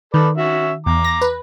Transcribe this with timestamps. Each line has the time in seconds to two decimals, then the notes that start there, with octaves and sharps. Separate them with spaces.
0.14 D#3 A4 B4 D5
0.37 C#4 F#4 E5
0.86 E2 A#5 D6
1.04 A#6
1.22 B4